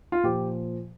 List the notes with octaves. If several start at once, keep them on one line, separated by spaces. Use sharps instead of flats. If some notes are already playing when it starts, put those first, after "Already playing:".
F4
A#2 F3 G4